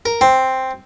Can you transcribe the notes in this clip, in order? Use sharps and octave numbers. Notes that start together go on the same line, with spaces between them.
A#4
C4